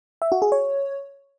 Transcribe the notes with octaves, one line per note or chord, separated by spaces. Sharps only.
E5
F#4
G#4
C#5